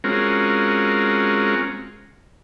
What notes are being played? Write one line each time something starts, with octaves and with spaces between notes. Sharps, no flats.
G#3 C4 C#4 F4 F#4 A#4